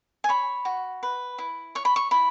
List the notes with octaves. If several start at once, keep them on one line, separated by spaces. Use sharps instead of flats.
G#5
C#5 B5
F#4
B4
E4
C#5 C#6
B5
C#6
E4 B5